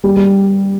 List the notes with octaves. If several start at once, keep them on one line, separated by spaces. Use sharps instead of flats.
G3
G3